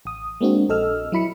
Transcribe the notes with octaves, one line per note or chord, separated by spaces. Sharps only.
A1 D#6
G#3 A#3 C4 D4 F#4
A#1 A4 D#5 E6 F6
F#3 E4 B5 C#7